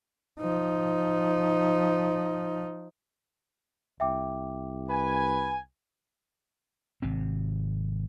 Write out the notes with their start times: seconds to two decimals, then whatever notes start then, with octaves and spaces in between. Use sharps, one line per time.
0.40 F3 D#4
4.00 C2 E5 G5 D6
4.89 B4 G#5
7.02 G#1 C3 C4